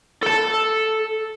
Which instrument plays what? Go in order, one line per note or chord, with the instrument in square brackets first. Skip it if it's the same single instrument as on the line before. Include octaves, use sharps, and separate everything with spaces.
[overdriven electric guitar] A4 A5